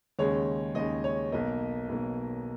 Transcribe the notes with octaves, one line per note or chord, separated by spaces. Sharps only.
D#2 C#3 G#3 C#5
D#2 C#3 G#3 D#5
C#5
B1 B2 A#3 D#5
B1 B2 A#3